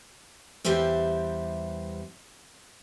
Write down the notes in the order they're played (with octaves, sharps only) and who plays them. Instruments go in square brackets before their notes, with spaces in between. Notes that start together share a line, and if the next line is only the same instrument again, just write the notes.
[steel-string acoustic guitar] E2 G3 G4 C5 E5